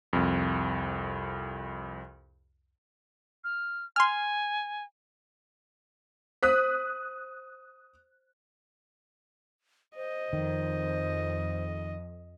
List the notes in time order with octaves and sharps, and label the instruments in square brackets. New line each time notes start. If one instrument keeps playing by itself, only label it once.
[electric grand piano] C2 F2
[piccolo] F6
[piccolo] G#5 [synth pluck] C6 F6
[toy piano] C5 [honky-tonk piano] D#6 F#6 B6
[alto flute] C5 [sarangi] D#5
[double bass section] F2 [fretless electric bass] D#3